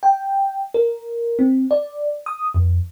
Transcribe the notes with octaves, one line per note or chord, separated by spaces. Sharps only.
G5
A#4
C4
D5
D#6
F2